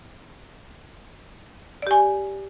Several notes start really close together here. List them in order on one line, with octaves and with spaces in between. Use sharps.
D5 G4 G#5